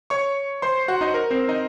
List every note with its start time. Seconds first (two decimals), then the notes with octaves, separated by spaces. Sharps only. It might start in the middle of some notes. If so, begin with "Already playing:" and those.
0.10 C#5 C#6
0.62 C5 C6
0.88 F#4 F#5
1.01 D#4 D#5
1.14 A#4
1.31 C4 C5
1.48 D#4 D#5